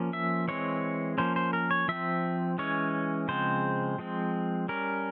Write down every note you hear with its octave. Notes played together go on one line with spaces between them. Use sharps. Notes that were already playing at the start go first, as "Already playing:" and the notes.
Already playing: F3 A#3 C#4
E5
E3 G#3 C4 C#5
F3 A#3 C#4 C5
C5
A#4
C#5
F3 C4 E5
E3 G#3 C#4 C#5
C#3 F3 G#3 C4 C5
F3 G#3 C4
G3 C#4 A#4